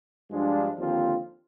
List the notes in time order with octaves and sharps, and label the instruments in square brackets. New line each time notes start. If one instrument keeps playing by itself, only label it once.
[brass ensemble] G2 F3 G#3 D4 F4
D#2 D3 F3 C4 F4